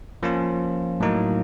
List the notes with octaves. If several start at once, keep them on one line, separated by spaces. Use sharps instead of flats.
F3 A#3 C#4 F4
A2 F#3 A#3 D#4